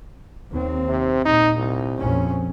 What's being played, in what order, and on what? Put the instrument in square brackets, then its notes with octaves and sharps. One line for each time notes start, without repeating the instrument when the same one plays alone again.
[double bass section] D#2 C4
[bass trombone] C3
[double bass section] A#2 [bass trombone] D#4
[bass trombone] C2
[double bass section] A#1 F2 C#4